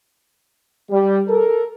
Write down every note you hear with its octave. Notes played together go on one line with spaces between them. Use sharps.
G3
A4 A#4